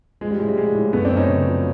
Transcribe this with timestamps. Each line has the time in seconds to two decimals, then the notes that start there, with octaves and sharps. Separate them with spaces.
0.21 F3 G#3
0.31 G3
0.39 A2 G#3
0.49 G3
0.57 F3 G#3
0.75 A2
0.93 F#2 A3 B3
1.05 C4 D4
1.11 F#2
1.17 C#4 D#4
1.28 C#3
1.47 F3